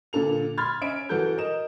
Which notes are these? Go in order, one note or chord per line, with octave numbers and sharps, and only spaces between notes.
A#2 D3 A4 F7
B5 C6 F6 G#6 A6
C#4 E5 D7
E3 F#4 A4 G6
A#4 D#5 E7